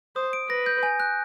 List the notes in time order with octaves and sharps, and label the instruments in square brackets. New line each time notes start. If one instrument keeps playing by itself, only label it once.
[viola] C5 [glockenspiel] D#6
[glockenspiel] D7
[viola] B4 [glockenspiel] A#6
[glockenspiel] G6
G#5
F#6